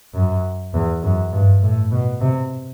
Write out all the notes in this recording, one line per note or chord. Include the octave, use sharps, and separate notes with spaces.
F#2
E2
F#2
G2
A2
B2
C3